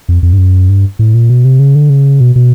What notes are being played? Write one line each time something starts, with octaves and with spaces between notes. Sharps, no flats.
F2
F2
G2
F#2
G2
A2
A#2
B2
C3
C#3
D3
C#3
B2
B2